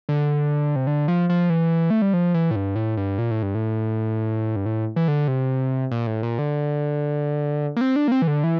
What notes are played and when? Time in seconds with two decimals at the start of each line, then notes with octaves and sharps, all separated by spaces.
0.09 D3
0.76 C3
0.87 D3
1.08 F3
1.29 F3
1.50 E3
1.90 A3
2.02 G3
2.14 F3
2.34 E3
2.51 A2
2.56 G2
2.76 A2
2.97 G2
3.18 A#2
3.31 A2
3.43 G2
3.55 A2
4.56 G2
4.66 A2
4.96 E3
5.08 D3
5.28 C3
5.91 A#2
6.07 A2
6.23 A#2
6.39 D3
7.76 A#3
7.81 C4
7.96 D4
8.08 A#3
8.12 C4
8.22 E3
8.27 D3
8.44 E3